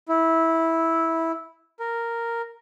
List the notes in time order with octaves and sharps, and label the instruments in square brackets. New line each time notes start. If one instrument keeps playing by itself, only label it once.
[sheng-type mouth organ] E4
A#4